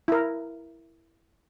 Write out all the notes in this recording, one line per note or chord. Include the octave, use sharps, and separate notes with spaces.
E4 A#4